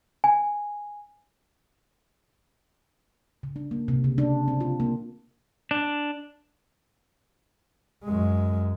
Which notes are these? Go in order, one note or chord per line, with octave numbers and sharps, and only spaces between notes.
G#5
C#3
D4
A#3
C3
C#3
D4
C4
F4
A#3
D4
F#2 G#3